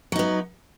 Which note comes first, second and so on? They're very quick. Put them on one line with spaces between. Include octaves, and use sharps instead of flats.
F#3 D#4 B3